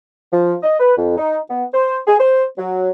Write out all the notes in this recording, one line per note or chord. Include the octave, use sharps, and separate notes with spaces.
F3
D#5
B4
F2
D#4
B3
C5
G#4
C5
F#3